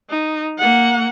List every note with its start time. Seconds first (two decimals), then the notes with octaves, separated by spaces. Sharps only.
0.10 D#4
0.58 A#3 F#5